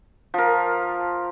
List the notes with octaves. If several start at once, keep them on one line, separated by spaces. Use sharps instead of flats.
F3 A#4